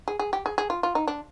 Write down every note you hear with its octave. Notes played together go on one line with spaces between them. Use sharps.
G#4
G#4
G4
G#4
G#4
F4
F4
D#4
D4